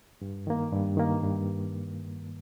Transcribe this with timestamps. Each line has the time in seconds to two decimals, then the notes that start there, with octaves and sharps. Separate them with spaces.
0.22 G2
0.47 D#3 A#3
0.72 G2
0.97 D#3 A#3
1.23 G2